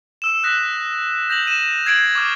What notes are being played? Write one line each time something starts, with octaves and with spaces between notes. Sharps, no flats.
E6 E7
D#6 F#6 A#6 B6
G6 A#6 F7 F#7
D#7 E7
E6 G#6 C7 D7 F#7
C#6 D6 F6 A6